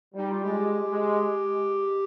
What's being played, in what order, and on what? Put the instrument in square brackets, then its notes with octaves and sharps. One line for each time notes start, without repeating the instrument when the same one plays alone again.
[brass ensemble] G3 [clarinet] D#4
[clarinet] F4
[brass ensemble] G#3 [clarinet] G4
[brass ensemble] G#3